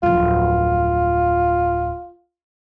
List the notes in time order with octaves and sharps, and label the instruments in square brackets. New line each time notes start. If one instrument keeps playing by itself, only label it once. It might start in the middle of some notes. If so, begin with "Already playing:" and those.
[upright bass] D1 F2 [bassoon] F4